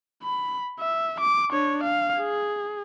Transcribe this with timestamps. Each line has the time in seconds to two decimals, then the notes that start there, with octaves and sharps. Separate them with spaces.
0.23 B5
0.80 E5
1.21 D6
1.51 D4 C#5
1.84 F5
2.19 G#4